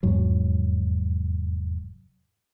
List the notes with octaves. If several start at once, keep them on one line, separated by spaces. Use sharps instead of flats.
F1 E2 G#2 F#3